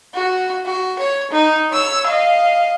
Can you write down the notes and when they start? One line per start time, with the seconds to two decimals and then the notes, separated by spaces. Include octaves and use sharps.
0.15 F#4
0.66 F#4
0.99 C#5
1.31 D#4
1.71 C#5 E6
2.07 D#5 F5